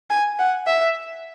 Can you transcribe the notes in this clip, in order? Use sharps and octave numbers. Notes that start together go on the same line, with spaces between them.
G#5
F#5
E5